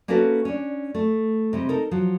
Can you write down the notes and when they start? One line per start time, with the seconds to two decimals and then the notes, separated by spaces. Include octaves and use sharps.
0.08 A#3 C#4 E4 F#4 A4 B4
0.45 C#4 D4
0.95 A3
1.53 C3 G3 G#3
1.69 D#4 A4 A#4
1.91 F3 F#3